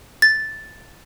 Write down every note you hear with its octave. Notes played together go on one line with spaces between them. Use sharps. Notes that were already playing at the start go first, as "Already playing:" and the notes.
A6